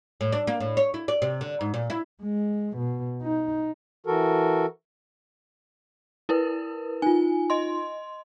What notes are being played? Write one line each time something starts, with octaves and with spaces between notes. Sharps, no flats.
A2
D4
A#3
A2
C#5
E4
D5
C3
D3
G#2
A#2
E4
G#3
B2
D#4
E3 F#4 A4 A#4
E4 A#4 B4
D#4 F4 G#5
D#5 C6